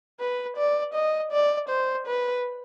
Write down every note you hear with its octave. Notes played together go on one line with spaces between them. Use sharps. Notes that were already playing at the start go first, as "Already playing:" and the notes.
B4
D5
D#5
D5
C5
B4